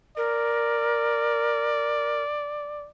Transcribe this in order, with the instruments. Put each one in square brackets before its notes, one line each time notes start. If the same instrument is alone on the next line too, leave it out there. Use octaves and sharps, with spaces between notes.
[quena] A#4 [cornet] D5